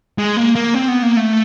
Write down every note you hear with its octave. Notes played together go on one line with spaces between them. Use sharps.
G#3
A#3
A#3
C4
B3
A#3
A3